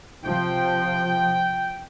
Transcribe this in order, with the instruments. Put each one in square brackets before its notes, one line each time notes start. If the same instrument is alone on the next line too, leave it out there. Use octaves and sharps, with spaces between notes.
[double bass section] C3 F3 [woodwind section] G5